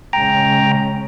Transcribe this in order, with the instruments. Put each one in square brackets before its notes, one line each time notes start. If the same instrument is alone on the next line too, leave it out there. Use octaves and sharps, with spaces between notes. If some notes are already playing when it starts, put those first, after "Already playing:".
[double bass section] C#3 G#3 C#4 [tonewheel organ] G5 A#5